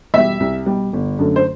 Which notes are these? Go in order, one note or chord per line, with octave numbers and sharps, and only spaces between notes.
E2 B2 G3 E5
C2
B2 G3
G1
F#2 D3 A3
C5